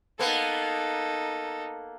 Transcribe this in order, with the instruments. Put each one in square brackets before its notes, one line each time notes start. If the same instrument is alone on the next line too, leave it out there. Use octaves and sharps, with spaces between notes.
[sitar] A#3 B3 [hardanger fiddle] D#4 A4